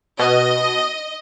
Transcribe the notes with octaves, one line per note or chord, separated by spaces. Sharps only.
B2 D#5